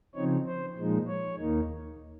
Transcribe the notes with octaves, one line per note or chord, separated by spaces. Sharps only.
C#3 F3 C4 D#4 C#5
C5
A#2 F3 G#3 D#4
C#5
D#2 D#3 A#3 D#4